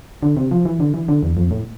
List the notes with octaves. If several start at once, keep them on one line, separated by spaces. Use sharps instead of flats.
D3
C3
F3
E3
D3
E3
D3
E2
F2
A2